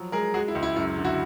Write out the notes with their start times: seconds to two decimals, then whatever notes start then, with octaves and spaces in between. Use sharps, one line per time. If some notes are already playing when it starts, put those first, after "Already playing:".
Already playing: F3 F#3
0.12 G#3 G#4 A#4
0.34 G#3 F#4 G#4
0.48 E4
0.55 C#2
0.63 E4
0.76 F#2 E4
0.97 D3
1.05 E4 F#4